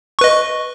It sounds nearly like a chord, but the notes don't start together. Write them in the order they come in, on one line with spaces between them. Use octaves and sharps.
C#6 B4 D#5